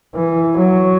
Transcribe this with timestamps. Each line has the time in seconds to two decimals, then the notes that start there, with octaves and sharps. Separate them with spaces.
0.15 E3
0.58 F#3